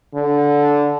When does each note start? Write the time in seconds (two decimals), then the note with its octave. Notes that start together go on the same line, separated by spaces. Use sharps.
0.15 D3